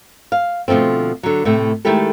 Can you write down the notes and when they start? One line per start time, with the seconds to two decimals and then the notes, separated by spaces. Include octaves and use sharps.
0.32 F5
0.68 B2 D3 F3 A3 C4
1.23 D3 F#3
1.45 A2 C3 A3
1.85 D#3 G#3 A3 E4 G4 A4